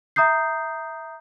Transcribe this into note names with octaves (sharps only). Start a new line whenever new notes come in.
E5 A#5 D#6 G6 C7